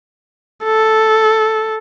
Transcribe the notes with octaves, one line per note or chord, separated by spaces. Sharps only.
A4